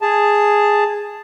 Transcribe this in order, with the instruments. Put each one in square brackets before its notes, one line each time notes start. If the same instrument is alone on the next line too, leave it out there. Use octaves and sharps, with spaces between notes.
[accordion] G#4 A5